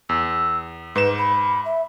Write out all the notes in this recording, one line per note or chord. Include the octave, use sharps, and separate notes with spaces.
E2 E6
G#2 B4 E7
B5
E5